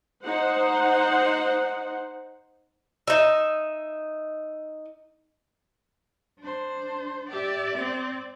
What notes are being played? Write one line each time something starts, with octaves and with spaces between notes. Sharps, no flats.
D#4 C5 F#5
D#4 E5
D4 C5
G4 D5 E5
C4